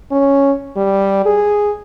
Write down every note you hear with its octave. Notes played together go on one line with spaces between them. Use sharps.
C#4
G3
G#4